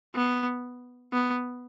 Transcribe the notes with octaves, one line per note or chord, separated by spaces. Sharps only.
B3
B3